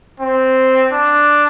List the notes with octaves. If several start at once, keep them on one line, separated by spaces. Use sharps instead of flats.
C4
D4